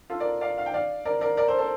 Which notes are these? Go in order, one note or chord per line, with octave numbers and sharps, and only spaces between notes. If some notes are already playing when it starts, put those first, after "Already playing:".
F4 A4
A#4 D5
D5 F5
F5
G5
D5 F5
A#4 D5
A#4 D5
A#4 D5
A4 C5
A4 C5